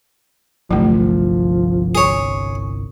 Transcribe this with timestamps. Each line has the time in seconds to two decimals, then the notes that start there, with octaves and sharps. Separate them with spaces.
0.71 G1 C2 F3 F#3 A3
1.95 G#4 C#5